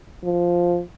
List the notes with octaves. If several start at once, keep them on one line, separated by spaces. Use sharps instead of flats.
F3